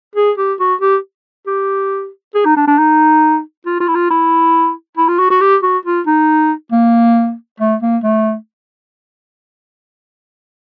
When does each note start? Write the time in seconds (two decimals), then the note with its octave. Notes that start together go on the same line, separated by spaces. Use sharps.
0.16 G#4
0.38 G4
0.59 F#4
0.81 G4
1.47 G4
2.35 G#4
2.45 D#4
2.56 D4
2.67 D4
2.78 D#4
3.66 F4
3.80 F4
3.88 E4
3.95 F4
4.10 E4
4.97 E4
5.08 F4
5.19 F#4
5.30 F#4
5.41 G4
5.63 F#4
5.85 F4
6.07 D#4
6.72 A#3
7.60 A3
7.82 A#3
8.04 A3